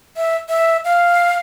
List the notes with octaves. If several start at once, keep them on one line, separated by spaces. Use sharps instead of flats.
E5
E5
F5